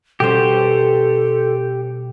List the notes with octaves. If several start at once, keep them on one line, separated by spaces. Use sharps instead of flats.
B2 G3 C#4 G4 A4 C5